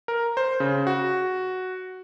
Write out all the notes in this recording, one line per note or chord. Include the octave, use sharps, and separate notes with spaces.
A#4
C5
C#3
F#4